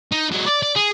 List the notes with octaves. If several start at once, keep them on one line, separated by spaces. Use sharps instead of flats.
D#4
F#3 G#3
D5
D5
G#4